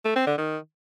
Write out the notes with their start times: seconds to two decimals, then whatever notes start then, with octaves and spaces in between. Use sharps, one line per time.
0.05 A3
0.16 C4
0.27 D3
0.38 D#3